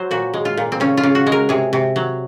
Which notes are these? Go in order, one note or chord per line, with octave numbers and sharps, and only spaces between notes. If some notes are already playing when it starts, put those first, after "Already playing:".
Already playing: F#3 C5
A#2 F#4
G#3
F4
A#2
C4
C#3 C#4
F4
C#3
F#4
G#3
A#4
C3 G#4
C3
F#3